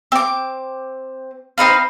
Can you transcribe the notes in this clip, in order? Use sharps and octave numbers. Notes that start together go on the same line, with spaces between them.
C4 D6
C4 D#4 B4 F5